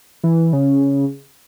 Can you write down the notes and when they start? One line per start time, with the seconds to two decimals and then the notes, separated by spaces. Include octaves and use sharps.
0.24 E3
0.53 C#3